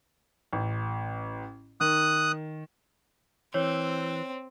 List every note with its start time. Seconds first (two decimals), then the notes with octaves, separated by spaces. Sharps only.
0.53 A1
1.81 D#3 D#6 F#6
3.54 E3 C4 C#5